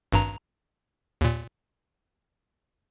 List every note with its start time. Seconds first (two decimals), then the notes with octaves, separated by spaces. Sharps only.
0.12 G#1 G2 A#5
1.21 D#2 A#2